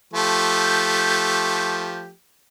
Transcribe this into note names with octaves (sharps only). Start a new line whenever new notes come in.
F3 A3 G4